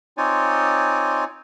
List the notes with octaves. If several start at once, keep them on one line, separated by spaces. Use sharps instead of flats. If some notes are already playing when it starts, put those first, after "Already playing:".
C4 D#4 F4 C#5 D5 G#5